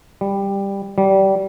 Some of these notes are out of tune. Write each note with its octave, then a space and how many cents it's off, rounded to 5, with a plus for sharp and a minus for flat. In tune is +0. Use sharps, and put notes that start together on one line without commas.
G3 +10
G3 -25